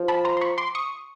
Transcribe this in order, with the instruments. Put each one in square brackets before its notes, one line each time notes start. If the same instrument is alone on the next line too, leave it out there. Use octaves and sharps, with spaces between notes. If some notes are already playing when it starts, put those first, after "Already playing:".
Already playing: [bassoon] F3
[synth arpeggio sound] A5 B5
A#5 C6
C6
B5 C#6
C6 D6
C#6 D#6